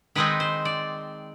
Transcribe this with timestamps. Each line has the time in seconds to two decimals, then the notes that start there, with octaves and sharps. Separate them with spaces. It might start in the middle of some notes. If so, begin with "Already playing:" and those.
0.15 D#3 G#3 C4 D#4 B4
0.40 C5
0.65 D5